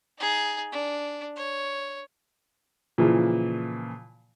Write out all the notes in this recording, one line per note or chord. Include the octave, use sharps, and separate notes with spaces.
D#4 G#4
D4
C#5
A#2 C#3 E3 F3